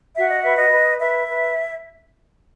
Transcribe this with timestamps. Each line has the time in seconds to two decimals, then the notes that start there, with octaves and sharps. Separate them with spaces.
0.16 F#4 E5
0.29 D#5
0.42 B4 E5
0.57 D#5
0.72 B4
0.99 B4 E5
1.27 B4